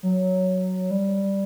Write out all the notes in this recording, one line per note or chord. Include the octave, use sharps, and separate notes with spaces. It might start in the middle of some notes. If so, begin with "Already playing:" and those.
F#3
G3